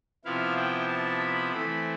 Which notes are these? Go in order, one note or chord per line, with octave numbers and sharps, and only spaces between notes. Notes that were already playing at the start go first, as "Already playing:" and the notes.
C3 F3 B3 E4 F5
G5
A5
B5
E3 A3 C4 B5